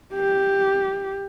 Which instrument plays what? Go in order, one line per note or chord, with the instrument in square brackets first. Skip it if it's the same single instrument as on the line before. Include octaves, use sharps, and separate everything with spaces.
[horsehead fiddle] G4